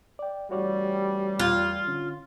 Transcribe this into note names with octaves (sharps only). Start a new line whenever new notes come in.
D5 G5
A1 G3 F#4 C#5 D5
E2 F4 F#6 G#6
D3 C#4